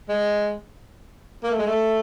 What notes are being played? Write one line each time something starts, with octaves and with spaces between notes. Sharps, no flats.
G#3
A#3
A3
G#3
A3